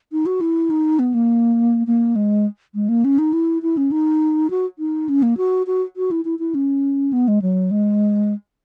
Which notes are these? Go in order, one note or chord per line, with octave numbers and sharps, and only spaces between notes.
D#4
F#4
E4
D#4
B3
A#3
A#3
G#3
G#3
A#3
C#4
D#4
E4
E4
C#4
D#4
F#4
D#4
C#4
A#3
F#4
F#4
F#4
E4
E4
E4
C#4
B3
G#3
F#3
G#3